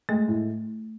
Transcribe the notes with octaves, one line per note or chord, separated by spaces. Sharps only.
G#3 A3
A2